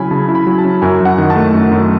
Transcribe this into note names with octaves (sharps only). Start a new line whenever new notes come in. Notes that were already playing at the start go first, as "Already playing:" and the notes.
Already playing: C#3 F#3 C#4 E4 G#5 B5
C#3 A5
E4
B5
F#3
A5
C#4
F#2 G#5
F#2 F#5
D#3
A5
A3
F#2
F#2